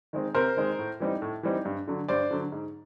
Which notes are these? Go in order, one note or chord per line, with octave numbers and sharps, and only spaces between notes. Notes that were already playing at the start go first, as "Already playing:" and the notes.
D#3 G#3 C4
C3 A#4 C5
D#3 G#3 C4
A2
E3 G3 C4 D#4
A2
E3 G3 C4 D#4
G2
D3 F#3
G2 C5 D5
D3 F#3
G#2